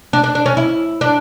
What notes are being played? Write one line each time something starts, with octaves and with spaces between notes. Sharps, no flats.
D4
D4
D4
C#4
E4
D4